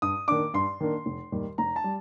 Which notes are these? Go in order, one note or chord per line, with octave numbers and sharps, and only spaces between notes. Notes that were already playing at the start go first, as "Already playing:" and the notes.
G2 D#6
D#3 A#3 D4 D6
G2 C6
D#3 A#3 D4
F1
D#2 D#3 G3
F1 A#5
A5
G3